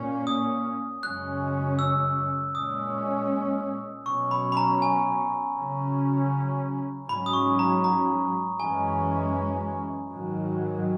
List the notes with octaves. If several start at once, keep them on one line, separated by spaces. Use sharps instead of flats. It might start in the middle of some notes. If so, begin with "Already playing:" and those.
Already playing: A#2 A#3 C#4
D#6
F#2 C#3 G#3 C#4 F#6
E6
A#2 G#3 C#4 D#6
B2 F#3 C#4 C#6
B5
B5
A#5
G#5
C#3 F#3 C#4
G#2 F#3 C#4 B5
D#6
C#6
A#5
A#5
F#2 E3 G#3 C#4 G#5
G#2 D#3 F#3